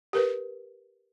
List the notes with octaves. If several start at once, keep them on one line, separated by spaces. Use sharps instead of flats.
G4 A#4 B4